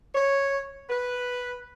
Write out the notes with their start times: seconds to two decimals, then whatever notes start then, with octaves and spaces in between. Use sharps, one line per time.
0.14 C#5
0.88 B4